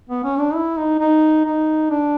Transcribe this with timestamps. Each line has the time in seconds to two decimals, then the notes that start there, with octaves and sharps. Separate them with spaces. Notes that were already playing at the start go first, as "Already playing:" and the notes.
0.10 B3
0.24 C#4
0.39 D4
0.54 E4
0.77 D#4
1.00 D#4
1.45 D#4
1.90 D4